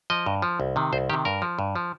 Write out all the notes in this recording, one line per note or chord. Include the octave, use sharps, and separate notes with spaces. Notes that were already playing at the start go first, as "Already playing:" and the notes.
F3 D#5
G2
F3
C2
C3 D#3
C2 C5
C3 D#3 G4
G2 A#4
F3
G2
F3